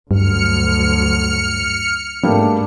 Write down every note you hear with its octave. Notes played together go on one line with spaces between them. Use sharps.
D2 G2 F#3 F6 C#7
G#2 G3 A3 A#3 D4